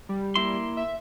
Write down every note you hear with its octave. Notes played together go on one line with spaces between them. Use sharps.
G3
A#3 E4 C6
E5